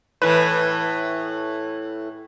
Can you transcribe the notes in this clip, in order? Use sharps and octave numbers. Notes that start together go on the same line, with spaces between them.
A2 E3 B4